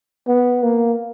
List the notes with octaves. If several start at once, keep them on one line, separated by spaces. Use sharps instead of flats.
B3
A#3